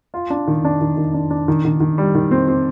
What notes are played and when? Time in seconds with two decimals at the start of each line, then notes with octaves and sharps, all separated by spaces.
0.14 F4
0.30 D4
0.48 D#3
0.65 D4
0.81 D#3
0.97 D#3
1.14 D4
1.30 D4
1.48 D#3
1.65 D#3
1.80 D#3
1.98 G3
2.15 D#3
2.31 C4
2.48 C4